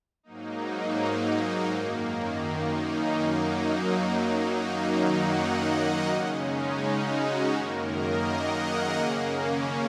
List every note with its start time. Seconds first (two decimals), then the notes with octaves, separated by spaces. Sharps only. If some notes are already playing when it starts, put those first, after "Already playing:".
0.23 G#2 F#3 A#3 D#4
1.70 F#2 D#3 A#3
2.43 D#4
2.78 C#4
3.15 F#2 F#3 A#3 D#4
4.60 F#2 D#3 F#3 A#3 D#4
4.97 F#5
5.34 D#5
5.70 D#4
6.07 C#3 G#3 C#4
6.44 D#4
6.79 F#4
7.53 F#2 D#3 A#3 A#4
7.89 D#5
8.25 F#5
8.62 G#4
8.98 C#3 A#3 C#4